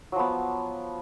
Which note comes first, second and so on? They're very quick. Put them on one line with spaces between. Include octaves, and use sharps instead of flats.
F#3 F3 B3